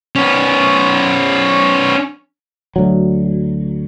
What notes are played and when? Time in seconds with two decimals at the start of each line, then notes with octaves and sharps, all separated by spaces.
0.16 B3 C#4
2.76 D2 F#3